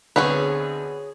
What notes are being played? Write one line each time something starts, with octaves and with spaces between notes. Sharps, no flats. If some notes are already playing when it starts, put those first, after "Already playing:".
D2 D3 B3 C4 G#4 B4 C#5